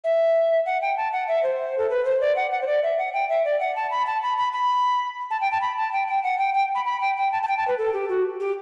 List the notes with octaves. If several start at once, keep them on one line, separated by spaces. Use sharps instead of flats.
E5
F#5
G5
A5
F#5
E5
C5
A4
B4
C5
D5
F#5
F#5
C5
D5
E5
F#5
G5
E5
D5
F#5
A5
B5
A5
B5
B5
B5
A5
G5
A5
B5
A5
G5
G5
F#5
G5
G5
B5
B5
G5
G5
A5
A5
G5
A5
B4
A4
G4
F#4
G4